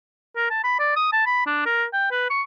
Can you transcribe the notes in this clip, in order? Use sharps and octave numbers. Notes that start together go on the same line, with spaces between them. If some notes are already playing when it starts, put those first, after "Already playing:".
A#4
A5
B5
D5
D#6
A5
B5
D4
A#4
G5
B4
C#6